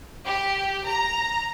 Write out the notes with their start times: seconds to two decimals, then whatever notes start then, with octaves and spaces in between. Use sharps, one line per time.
0.25 G4
0.86 A#5